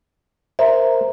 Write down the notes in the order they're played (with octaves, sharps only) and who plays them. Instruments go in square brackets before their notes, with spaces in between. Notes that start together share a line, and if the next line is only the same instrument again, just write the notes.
[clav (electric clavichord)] A#4 C5 [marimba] E5